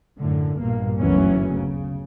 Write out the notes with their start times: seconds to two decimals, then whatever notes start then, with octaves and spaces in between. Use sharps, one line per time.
0.18 F#2 A2 D3
0.59 A#1 G2 B2 A#3
0.98 F#1 D2 E3 F#3 B3 C#4
1.53 C#3